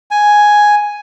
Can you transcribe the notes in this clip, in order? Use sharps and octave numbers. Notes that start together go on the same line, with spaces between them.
G#5